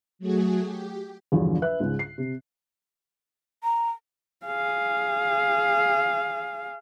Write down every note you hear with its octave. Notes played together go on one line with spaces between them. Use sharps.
F#3 A3 F#4 G#4
G4
A#1 E2 G2 D3 F3 F#3
B4 E5 F#6
C#2 G#2
C7
C3
A#5
G#4 F5